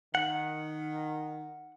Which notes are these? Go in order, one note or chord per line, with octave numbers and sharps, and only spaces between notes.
D#3 F#5